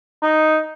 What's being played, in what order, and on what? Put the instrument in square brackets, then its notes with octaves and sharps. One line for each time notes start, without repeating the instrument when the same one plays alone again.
[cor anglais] D#4